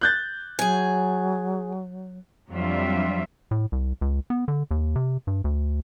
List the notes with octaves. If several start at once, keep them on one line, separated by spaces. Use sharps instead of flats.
F#6 G6 A6
F#3 G#4 G#5
F2 F#3 G3 D4 F4 E5
A2
C2
C#2
B3
D3
D#2
C3
G2
D2